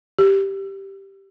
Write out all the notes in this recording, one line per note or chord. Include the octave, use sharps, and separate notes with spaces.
G4